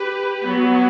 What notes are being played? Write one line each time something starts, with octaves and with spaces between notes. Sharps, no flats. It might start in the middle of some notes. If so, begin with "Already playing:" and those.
Already playing: G4 B4
F#3 B3